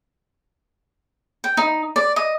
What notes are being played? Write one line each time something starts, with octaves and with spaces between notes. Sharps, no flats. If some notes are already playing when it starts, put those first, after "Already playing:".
G5
D#4
D5
D#5